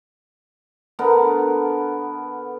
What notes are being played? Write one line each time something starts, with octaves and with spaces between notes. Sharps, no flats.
D3 B3 A#4